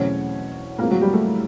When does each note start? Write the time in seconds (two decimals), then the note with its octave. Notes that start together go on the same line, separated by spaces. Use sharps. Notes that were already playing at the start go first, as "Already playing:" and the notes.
Already playing: E2 B2 F#3 A3 C4 C#4 C#5
0.78 A2 F3 G#3 A#3 C4 A#4
0.91 F#3 F#4
1.01 G3 G4
1.13 A3 A4